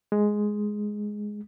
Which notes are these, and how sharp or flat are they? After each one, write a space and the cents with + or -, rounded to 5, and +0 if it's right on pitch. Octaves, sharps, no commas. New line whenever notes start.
G#3 +5